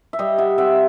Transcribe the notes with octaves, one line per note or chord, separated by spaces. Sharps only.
E5
G3 D#5 F5
E5 F#5
C4 E5 F#5